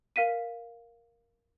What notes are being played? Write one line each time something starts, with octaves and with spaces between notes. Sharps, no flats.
A#4 F5 B6 D#7